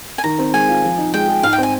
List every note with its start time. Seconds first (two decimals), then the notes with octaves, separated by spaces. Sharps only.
0.18 G#5
0.24 D#3 A#5
0.39 C4
0.54 G#3 G#5
0.69 F4
0.84 F3
0.98 D#4
1.14 G#3 G5
1.28 G#4
1.43 G#2 F5
1.53 G5
1.58 C4 G#5